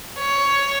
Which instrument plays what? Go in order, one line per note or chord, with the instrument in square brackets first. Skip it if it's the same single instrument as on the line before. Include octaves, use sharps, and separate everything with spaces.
[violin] C#5